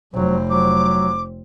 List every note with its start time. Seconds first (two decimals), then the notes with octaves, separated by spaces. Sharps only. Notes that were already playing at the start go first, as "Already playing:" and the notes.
0.14 F1 F#3 C4
0.50 F#3 D6